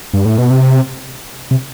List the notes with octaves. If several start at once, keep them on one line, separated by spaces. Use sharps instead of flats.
G2
A2
B2
C3
C3